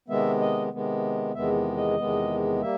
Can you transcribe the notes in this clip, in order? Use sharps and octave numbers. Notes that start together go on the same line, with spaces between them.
C3 D#3 G#3 B3 E5
D#5
C3 D#3 G#3 B3
E2 C3 D#3 G#3 B3 E5
D#5
E2 C3 D#3 G#3 B3
G3 A#3 E5